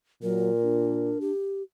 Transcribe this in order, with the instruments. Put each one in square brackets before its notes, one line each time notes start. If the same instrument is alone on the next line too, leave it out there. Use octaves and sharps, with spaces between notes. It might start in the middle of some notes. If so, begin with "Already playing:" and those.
[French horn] A#2 [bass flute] F#3 [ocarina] A#4
[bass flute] D4
[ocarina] G4